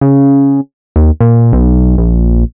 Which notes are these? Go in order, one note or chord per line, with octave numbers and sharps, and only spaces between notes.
C#3
D#2
A#2
B1
A#1